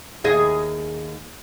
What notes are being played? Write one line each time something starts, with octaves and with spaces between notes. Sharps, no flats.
D#2 G#4 D#5